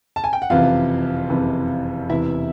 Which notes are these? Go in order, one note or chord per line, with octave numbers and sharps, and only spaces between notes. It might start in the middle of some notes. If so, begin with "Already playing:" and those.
A5
G#5
G5
F#5
F#1 F2 C3 E3 F4 F5
F#1 F2 C3 E3
E1 E2 C3 E3 E4 E5